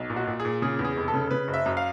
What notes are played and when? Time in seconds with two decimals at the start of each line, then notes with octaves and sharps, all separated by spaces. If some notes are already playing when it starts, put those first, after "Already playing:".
Already playing: B1
0.10 A#2
0.16 F#4
0.27 A#2
0.40 G#4
0.45 A#2
0.62 C#3 G#4
0.79 E2
0.85 G#4
0.97 F1
1.08 A4
1.14 C#3
1.31 C#3 B4
1.48 F#1
1.54 E5
1.66 F#2
1.77 F5